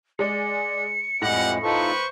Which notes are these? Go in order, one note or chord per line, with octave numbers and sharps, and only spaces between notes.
G#3 G#4 D5 C#7
F2 A2 G3 G#3 G4 F#5 A#6 F#7
D#4 F4 A4 B4 C5 C#6